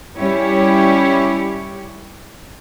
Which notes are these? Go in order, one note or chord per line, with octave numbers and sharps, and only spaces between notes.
G3 C#4 E4 G4 C#5